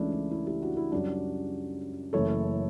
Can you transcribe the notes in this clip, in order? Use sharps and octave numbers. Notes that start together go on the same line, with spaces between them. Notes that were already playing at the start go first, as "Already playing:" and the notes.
Already playing: C#2 C#3 E3 A3 C#4 D4 E4
D4
E4
E4 G4
D4 F#4
E4
F#2 C#3 G3 C#4 D4 F#4
F#1 F#2 C#3 E3 A3 A4 C#5